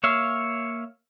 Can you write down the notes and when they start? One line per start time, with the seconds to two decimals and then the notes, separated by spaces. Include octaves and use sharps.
0.04 A#3 C#5 E5 F5